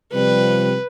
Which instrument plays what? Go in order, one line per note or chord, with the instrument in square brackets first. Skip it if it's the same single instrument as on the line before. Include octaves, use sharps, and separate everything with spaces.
[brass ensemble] C3 F3 G3 [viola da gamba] B4